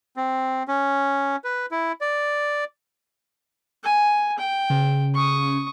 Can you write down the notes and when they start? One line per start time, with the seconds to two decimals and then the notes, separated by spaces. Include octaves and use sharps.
0.17 C4
0.68 C#4
1.44 B4
1.71 E4
2.01 D5
3.84 G#5
4.38 G5
4.70 C#3
5.14 C#6 D#6